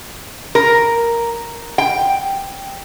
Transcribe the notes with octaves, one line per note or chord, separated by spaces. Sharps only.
A#4
G5